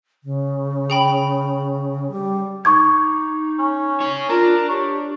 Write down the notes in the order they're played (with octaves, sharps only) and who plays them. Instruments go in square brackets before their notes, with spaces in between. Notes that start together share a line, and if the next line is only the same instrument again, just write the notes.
[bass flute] C#3
[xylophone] G#4 G5 B5
[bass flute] G3
[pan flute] D#4 [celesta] C#6 D6 G#6
[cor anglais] C#4
[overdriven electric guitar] G#4 C#5
[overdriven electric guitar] D4 [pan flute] F4 [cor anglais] A#4
[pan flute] G4 [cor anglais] C#5